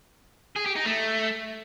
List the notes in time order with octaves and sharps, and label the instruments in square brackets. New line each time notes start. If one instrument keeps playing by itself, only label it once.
[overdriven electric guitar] G#4
G4
D#4
A3